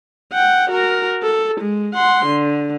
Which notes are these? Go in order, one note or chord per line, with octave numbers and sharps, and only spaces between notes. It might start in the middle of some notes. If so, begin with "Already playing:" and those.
F#5 G5
F#4 A#4
A4
G#3
F#5 C6
D3